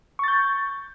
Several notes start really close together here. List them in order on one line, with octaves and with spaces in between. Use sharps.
C#6 A6 G6